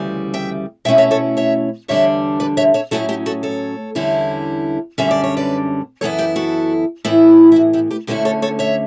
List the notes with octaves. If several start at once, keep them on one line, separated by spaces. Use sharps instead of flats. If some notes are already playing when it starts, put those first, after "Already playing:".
Already playing: D2 C#3 E3 G3
E5 G5
B2 A3 C#4 E4 E5 G5
C#5 E5
A4 C#5
C#5 E5
E2 D3 G3 D4 C#5 E5
B4 D5
C#5 E5
C#5 E5
A2 F#3 C#4 E4 F#4 A4
E4 G4
F#4 A4
A4 C#5
E2 D3 G3 C#4 E4
F#2 D3 G3 C#4 E5
D5
C#5
B4 D5
F#2 E3 B3 E4 A4 C#5
G4 B4
F#4 A4
A2 E3 B3 E4
E4
F#4
E4 G4
G4 B4
D2 D3 A3 C#4 E4 G4 B4
A4 C#5
A4 C#5
C#5 E5